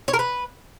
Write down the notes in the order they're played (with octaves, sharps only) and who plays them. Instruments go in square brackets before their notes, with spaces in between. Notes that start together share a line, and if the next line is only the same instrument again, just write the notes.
[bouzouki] C#5
A#4
B4